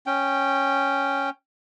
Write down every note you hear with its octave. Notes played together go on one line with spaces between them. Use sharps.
C#4 G5